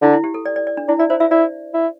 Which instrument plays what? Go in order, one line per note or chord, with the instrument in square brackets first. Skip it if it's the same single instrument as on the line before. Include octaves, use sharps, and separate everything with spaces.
[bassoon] D3 [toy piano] E4
[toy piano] E4
G4
A4
D5
D5
D5
D4
[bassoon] D4 [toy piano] E4
[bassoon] E4 [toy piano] D5
[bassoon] E4 [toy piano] C5
[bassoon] E4 [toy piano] E5
[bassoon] E4 [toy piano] D5
[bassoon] E4